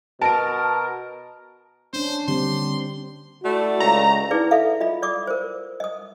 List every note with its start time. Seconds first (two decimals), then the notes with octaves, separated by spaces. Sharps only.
0.21 B2 A#4 A5 D7
1.93 C#4 D4 C5
2.28 D3 G3 A#3 C4 G4 C6
3.43 A3 E4 F#4 D5
3.80 C#2 A#5
4.31 D#4 E4 G#4 B4 D5
4.51 A4 E5 F5
4.80 F4 D#5 B5
5.02 D5 D6 D#6
5.27 A#4 C5
5.80 D#5 D#6